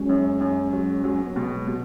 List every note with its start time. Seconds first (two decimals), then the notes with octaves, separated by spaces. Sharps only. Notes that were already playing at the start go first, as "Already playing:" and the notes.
Already playing: F#3 G#3 C#4
0.09 F#2
0.41 F#2
0.73 F#3
1.04 F#3
1.26 B3
1.36 B2 G#3
1.57 G#3
1.67 B2